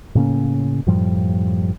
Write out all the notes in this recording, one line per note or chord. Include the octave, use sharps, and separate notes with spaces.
A2 C#3 A#3 C#4
F#2 A2 F3 G3